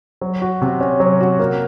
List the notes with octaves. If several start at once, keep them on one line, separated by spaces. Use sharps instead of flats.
F#3
F#4
C3
C#4
F#3
F#4
A#3